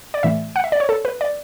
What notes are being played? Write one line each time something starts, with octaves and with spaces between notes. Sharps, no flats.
D5
A2 E3 A3 E5
F#5
E5
D5
C#5
A4
B4
D5